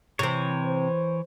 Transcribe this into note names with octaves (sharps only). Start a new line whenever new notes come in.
C3 E3 C4 C#5
C5